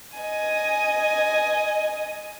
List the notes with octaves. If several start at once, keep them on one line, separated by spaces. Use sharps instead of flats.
D#5 G#5